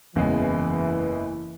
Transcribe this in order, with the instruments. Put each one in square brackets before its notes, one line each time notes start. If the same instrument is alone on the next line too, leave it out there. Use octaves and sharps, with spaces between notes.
[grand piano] F#1 E2 C#3 G#3 [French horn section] E3